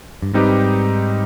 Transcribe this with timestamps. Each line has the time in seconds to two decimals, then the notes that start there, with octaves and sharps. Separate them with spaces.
0.22 G2
0.34 G#2 G3 C4 D#4 G4 B4